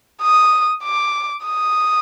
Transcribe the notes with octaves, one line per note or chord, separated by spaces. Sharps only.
D#6
D6
D#6